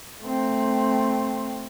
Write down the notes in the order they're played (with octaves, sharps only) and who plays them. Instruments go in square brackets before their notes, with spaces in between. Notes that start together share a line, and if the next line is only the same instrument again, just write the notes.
[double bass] A3 C4